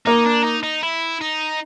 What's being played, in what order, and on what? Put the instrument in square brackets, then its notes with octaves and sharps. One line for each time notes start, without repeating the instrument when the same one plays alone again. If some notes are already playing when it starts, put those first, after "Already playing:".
[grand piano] A#3 [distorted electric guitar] D#4
[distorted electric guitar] D4
D#4
D#4
E4
D#4